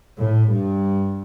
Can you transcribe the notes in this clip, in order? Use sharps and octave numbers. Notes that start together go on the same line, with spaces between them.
A2
G2